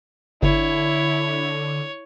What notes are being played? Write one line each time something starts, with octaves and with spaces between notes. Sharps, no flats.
G1 D3 E4 C#5